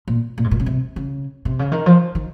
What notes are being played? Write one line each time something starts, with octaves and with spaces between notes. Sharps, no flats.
A#2
A#2
G#2
A#2
C#3
C3
C#3
C3
C#3
D#3
F3
D#3